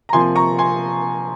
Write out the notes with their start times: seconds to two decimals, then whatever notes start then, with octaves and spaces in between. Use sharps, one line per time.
0.09 A#5
0.13 C3 F3 A#3 G#5 C6
0.36 A#5 C#6
0.58 G#5 C6